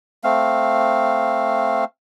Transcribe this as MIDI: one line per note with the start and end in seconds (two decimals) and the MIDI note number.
0.24 1.85 57
0.24 1.85 60
0.24 1.85 77